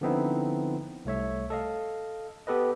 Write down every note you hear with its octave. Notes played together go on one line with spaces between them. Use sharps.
D3 F3 B3 C4 D#4 E4
C2 A3 C#5 E5
A4 D#5 F5
B3 G4 A4 B4 D#5